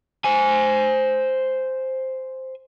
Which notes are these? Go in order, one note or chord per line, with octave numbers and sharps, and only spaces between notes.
C5 G#5